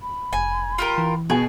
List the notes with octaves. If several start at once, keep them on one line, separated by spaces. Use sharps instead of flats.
B5
F1 G#5
F4 G4 A#4
E3
B2 G#4 G#5